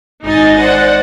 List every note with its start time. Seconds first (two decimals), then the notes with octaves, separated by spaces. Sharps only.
0.23 G#1 D#4 D#5 G#5 A6
0.57 C5 D5 F#5